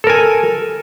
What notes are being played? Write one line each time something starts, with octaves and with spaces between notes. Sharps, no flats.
A4 A#4 G#5